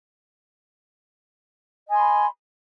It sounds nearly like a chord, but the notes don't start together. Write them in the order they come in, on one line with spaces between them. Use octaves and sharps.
D#5 G#5 C6 B5